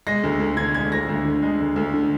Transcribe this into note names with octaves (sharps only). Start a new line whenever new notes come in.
G#3 A#6
D2
D2
D3 G#6
G#3 G#6
D2 A#6
D2
D3
G#3
D2
D2
D3